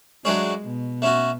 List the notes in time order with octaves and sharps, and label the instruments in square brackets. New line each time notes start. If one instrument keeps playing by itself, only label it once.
[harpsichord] F#3 A3 D4 G#4 C#5 [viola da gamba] G#3
[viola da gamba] B2
[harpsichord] A3 C#4 F#4